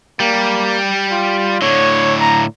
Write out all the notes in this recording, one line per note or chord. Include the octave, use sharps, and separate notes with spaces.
G3 A#3
F4
A2 D3 C#5
A#5